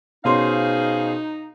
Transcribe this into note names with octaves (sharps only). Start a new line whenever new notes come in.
B2 C#4 D#4 G#4 C5 F5 C6